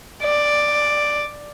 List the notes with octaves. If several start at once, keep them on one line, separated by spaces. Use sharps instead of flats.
D5